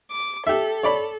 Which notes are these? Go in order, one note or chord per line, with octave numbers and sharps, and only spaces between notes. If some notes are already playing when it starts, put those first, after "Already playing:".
D6
G4 A4 E5
C#5 D5 B5